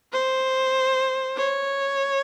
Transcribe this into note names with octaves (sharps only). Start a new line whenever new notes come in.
C5
C#5